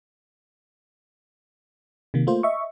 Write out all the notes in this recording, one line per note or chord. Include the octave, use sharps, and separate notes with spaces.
C3 D#3 A#3
A3 A#3 F4 C5
D#5 E5 C#6